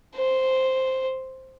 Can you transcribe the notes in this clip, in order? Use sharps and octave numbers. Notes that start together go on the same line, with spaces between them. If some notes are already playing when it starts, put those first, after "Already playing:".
C5